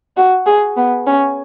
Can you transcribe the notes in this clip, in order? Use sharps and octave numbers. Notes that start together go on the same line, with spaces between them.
F#4
G#4
B3
C#4